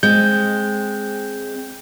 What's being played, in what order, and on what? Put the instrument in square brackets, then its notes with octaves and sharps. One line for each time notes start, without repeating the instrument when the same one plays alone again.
[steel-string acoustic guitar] G#3 C4 [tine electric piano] G6